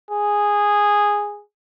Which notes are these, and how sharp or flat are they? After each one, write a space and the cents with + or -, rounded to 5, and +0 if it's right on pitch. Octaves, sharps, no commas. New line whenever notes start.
G#4 -10